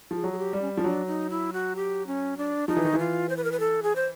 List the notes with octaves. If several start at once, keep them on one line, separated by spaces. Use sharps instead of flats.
F3 G#4
F#3
G#4
G4
G3
C#4
F3 C#4
F#3 D4
D#4
E4
F#4
G4
C#4
D4
F3 D#4
E3
D#3
E3
F4
C5
B4
A#4
B4
A4
G#4
C5